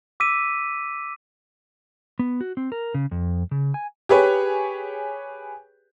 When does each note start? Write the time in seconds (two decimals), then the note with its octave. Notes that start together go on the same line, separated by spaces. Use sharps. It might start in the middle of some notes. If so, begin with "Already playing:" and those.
0.20 D6 E6 B6 D#7
2.19 B3
2.41 F#4
2.57 C4
2.72 A#4
2.94 C#3
3.11 F2
3.51 C#3
3.74 G#5
4.09 G4 G#4 B4 C#5